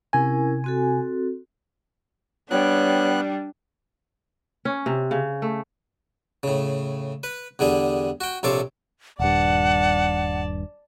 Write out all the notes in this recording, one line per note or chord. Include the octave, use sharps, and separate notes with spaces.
C3 C#4 E4 A#4 G#5
C4 F#4 A4
G3 B3 D4 C#5 F#6
C#4
C3
C#3
A3
A2 C#3
B4
E2 D3 G3 G#4
F#4 G5
A#1 C3 A4 C#5 F5 D6
D#1 G2 D5 F#5 A5